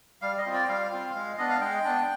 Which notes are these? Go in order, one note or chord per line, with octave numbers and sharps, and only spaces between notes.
G3 F5
D#5
C4 F4
D5
G5
G3 F5
C4 F4
G#3
B3 D4 D#5
F5
G#3 G5
B3 D4